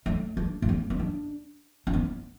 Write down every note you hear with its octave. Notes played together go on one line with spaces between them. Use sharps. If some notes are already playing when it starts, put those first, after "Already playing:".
A3
D4
A3
B3
B3
D4
D4
B3